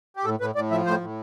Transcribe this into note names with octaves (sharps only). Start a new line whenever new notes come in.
G4
A2 A4
A2 B4
A2 D5
F3 E5
A2 C5
A2